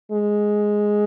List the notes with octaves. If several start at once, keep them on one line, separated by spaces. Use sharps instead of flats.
G#3